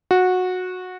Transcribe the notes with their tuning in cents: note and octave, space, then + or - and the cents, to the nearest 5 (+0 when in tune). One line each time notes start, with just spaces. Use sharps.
F#4 -15